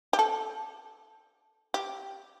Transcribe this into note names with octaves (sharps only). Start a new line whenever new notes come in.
G4
A4
G4